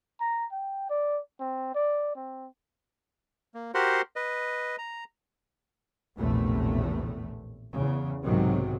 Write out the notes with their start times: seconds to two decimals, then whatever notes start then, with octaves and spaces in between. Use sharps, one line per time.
0.21 A#5
0.52 G5
0.90 D5
1.40 C4
1.75 D5
2.16 C4
3.54 A#3
3.74 F#4 G4 A#4 C5 F#5 C6
4.16 B4 D#5
4.78 A#5
6.17 A#1 E2 A2 C3 A3
7.72 E2 C#3
8.23 B1 G#2 C3 D#3 F#3